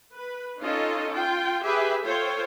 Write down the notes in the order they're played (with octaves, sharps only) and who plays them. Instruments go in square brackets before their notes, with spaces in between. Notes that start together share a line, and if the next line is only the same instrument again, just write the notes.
[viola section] B4
C#4 D#4 F4 A4 D#5
F4 G5
G4 G#4 B4 E5
F4 A4 C5 C#5 G5